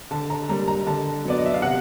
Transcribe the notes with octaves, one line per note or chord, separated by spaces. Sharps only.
D3 A5
A#5
G3 A#3 A#5
A#5
D3 A5
F#3 B3 D5
D#5
E5
F5
C3 F#5